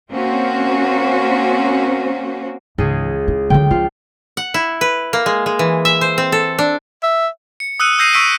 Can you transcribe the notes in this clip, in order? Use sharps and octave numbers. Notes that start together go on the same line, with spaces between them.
A#3 C4 C#4 F#4 C5
C#2 G#2 E3 G#4
E4
D3 F#3 G5
F3 F4
F#5
E4
B4
A#3
G#3
G#3
E3
E5
C5
C4
A4
D4
E5
C#7
D#6 E6 F#6 C#7 D#7
D#6 E6 G6 A#6 C7 D#7
C#6 E6 B6 D7 D#7